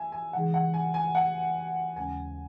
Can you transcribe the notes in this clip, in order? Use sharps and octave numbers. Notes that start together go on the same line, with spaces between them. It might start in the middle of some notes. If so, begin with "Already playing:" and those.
Already playing: E5 G#5
G#5
C#3 E3 G#3 D#4 G#4 F#5
F#5
G#5
G#5
F#5
D#2 C#3 G#3 C#4 G#5